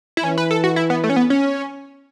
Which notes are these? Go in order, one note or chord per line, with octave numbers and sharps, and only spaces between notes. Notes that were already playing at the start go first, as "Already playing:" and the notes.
E4
E3 C#4
B4
A4
F#4
E4
B3
A3
C#4
B3
C#4